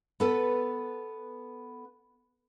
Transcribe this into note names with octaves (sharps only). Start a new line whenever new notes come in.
B3 A4 B4